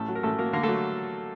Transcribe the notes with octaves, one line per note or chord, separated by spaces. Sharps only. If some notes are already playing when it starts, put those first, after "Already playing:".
Already playing: A1 A2 A3 A4
F#3
A#4
A1 A3 A4
F#3 A#3 A#4
D3 A#3 A#4
A3 A4
F#3